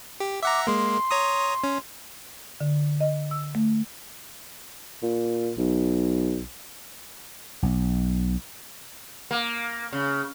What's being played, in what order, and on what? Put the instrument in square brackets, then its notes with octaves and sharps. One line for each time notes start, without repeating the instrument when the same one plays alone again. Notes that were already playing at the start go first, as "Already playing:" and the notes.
[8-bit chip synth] G4
[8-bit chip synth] E5 F#5 A#5 [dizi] D6
[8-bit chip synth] G#3 A#3 [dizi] C6
[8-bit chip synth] C#5 A#5 D#6
C#4
[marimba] D3
D#5
E6
A3
[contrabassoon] A#2
B1
[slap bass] B1
[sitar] A#3
C#3